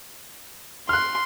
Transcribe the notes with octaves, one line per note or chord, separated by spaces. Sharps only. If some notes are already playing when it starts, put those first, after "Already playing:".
C6 F6 F#6